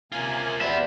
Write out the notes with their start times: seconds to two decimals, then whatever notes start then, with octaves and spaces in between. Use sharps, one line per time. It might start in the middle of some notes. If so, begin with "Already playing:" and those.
0.12 C3 A#3 C#4 F4 G#5
0.61 B3 G4 C5 D5 E5